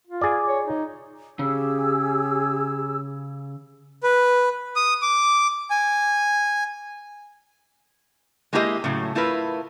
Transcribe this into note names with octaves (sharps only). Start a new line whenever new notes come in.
F4
G#4 D5
C#5
D#4
C#3 G4 G#4 E6
B4
D#6
D6
G#5
G#3 A#3 E4 G4 A#4 D#5
A2 C#3 F#3
A3 E4 F4 A#4 B4